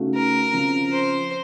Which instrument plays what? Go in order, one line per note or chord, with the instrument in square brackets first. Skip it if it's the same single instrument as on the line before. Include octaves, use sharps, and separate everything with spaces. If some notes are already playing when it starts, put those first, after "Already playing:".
Already playing: [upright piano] C#3 A3 D#4 F#4
[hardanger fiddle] A#4
[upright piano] C#3 F3 C4
[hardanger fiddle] C5